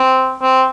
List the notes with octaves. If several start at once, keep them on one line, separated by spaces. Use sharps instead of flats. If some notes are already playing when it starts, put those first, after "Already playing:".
Already playing: C4
C4